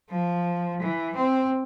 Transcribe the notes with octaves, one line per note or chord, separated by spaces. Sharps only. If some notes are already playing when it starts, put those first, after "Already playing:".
F3
E3
C4